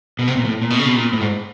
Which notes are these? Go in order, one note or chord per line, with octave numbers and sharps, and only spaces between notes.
B2
C3
A#2
A2
A#2
B2
C#3
B2
A#2
A2
G#2